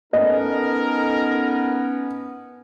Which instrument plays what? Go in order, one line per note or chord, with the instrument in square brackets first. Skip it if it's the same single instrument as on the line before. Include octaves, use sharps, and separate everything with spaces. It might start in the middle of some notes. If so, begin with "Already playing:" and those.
[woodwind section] B3 C#4 [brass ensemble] D#4 A4 A#4 [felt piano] D#5